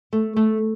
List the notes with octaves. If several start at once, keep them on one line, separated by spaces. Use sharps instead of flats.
A3
A3